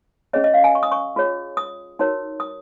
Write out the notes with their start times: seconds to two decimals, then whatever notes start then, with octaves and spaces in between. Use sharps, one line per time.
0.33 C#4 G#4 C#5 D#5
0.44 D#5
0.54 F5
0.64 G#5
0.75 C#6
0.83 D#6
0.92 C#6
1.16 F4 G#4 C#5
1.57 D#6
1.99 D#4 F#4 A#4 C#5
2.40 D#6